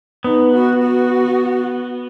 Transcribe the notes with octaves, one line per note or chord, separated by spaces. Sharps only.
B3 D#4
F#4
F#4